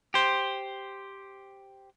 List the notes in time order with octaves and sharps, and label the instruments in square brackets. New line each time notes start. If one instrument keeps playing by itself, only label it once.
[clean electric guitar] G4 C5